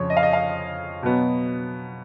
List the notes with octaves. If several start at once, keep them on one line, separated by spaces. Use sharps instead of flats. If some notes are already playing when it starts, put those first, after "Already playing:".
Already playing: F2 C#3 F3 C#5
D#5
F5
D#5
F5
B2 F#3 B3